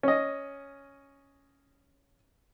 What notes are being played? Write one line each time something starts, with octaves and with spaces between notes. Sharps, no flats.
C#4 D#5